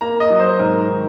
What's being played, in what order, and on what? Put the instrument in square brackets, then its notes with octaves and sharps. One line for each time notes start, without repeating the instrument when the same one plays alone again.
[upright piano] A#3 A#5
D#5
F#3
C5
G#2 A#4
D#3